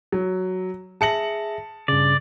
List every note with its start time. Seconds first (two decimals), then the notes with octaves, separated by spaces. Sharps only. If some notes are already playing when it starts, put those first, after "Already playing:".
0.12 F#3
1.01 G#4 E5 A5 A#6 C#7 F#7
1.88 G2 C#3 D5